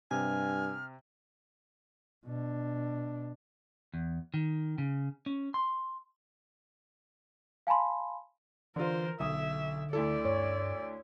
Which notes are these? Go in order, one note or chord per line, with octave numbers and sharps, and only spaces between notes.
G2 C3 G#5 F6
B2 D4
E2
D#3
C#3
C#4
C6
F5 G#5 A5 B5 C6
D3 E3 F4 A#4 C5
B1 D3 E5 D#6
D2 E4 A4 D5
G2 C#5